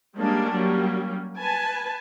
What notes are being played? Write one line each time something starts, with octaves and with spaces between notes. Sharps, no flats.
G3 G#3 A#3 C#4 D4
F#3 G3 A#3 C#4
B4 G#5 A5